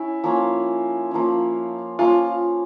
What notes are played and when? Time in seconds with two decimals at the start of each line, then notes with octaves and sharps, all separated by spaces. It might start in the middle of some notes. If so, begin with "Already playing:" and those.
Already playing: C#4 E4
0.24 F3 A#3 C#4
1.11 F3 A#3 C#4
1.99 F3 A#3 C#4 F4